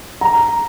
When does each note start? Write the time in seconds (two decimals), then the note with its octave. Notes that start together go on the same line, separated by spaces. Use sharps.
0.21 A#5